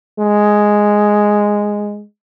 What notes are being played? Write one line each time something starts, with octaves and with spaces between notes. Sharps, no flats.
G#3